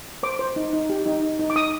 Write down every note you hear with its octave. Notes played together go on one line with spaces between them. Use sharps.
C5 D6
C5
D#4
D#4
G4
D#4
D#4
D#4
D6
D#4 D#6